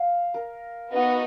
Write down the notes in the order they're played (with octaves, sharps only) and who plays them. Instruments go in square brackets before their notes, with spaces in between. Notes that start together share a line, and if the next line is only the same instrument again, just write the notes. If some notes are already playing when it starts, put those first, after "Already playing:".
Already playing: [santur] F5
A#4
[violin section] B3 D#4 F#4